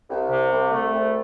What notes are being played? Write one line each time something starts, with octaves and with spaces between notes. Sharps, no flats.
C2
C3
C2
A3
C2